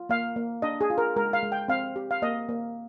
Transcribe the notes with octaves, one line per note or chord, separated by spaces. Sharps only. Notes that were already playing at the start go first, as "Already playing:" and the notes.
Already playing: F4
A#3 F5
A#3
D4 D#5
G#4
F4
A#4
G#3 A#4
F5
G#3
G5
C4 F5
G4
F5
A#3 D#5
A#3